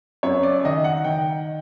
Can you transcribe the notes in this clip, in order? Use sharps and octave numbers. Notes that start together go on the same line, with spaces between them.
F#2 C#5
D5
D#3 D#5
F#5
D#3 G5